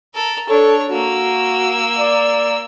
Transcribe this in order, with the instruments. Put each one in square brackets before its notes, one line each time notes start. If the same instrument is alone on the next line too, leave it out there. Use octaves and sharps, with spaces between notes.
[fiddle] A4 A#4
[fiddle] D4 C#5 [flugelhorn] A4
[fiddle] A#3 E6 [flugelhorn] F#4
[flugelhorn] D5